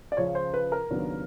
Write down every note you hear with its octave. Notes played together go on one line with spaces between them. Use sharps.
D5
C#2 C#3 F3 C#5
C5
B4
A#4
D#2 C#3 F#3 B3 D4